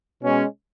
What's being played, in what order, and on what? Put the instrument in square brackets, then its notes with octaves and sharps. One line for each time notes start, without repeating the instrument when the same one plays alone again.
[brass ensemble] B2 G#3 C#4